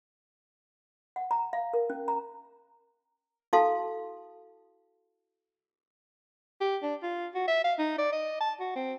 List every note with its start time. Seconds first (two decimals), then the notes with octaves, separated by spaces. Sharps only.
1.16 F#5
1.31 A#5
1.53 F5
1.73 A#4
1.90 C#4
2.08 A#5
3.53 E4 F#4 A4 F5 A5 C6
6.61 G4
6.82 D4
7.02 F4
7.34 F#4
7.47 E5
7.64 F5
7.78 D#4
7.98 D5
8.12 D#5
8.40 A5
8.60 F#4
8.76 C4